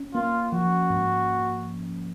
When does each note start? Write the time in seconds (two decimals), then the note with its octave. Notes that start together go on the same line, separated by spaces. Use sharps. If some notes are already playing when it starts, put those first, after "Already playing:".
Already playing: C#4
0.14 A#3 F4
0.52 F3 F#4
0.90 G#2